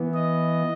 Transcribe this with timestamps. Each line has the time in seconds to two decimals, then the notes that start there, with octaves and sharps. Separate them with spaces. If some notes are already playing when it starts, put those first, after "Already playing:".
Already playing: E3 B3
0.14 D#5